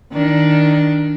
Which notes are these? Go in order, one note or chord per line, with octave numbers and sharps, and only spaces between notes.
D#3 D4